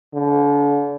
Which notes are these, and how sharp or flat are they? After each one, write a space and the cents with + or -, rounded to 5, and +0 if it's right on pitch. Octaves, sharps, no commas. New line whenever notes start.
D3 -40